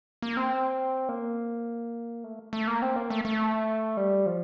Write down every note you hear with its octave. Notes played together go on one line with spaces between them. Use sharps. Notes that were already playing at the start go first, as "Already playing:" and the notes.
A#3
C4
A#3
A3
A3
A#3
C4
A#3
A3
A3
G3
F3